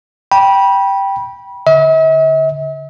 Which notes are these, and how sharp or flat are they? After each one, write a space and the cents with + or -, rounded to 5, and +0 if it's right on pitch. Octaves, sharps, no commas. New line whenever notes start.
G5 +0 B5 -25
D3 -35 E5 -45